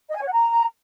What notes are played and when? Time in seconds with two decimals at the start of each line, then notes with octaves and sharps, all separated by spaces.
0.10 D#5
0.15 G#5
0.21 C#5
0.26 F#5
0.32 A#5